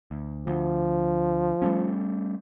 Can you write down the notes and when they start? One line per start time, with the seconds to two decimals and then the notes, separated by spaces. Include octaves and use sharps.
0.11 D2
0.47 D2 F3
1.62 G3 A3 C#4